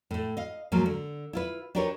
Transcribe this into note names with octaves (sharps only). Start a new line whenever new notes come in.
A2 A3
D#5 F5
G#2 F3 F#3 A#3
D3
E4 F4 B4
D4 D#4 G4 A#4 B4 C#5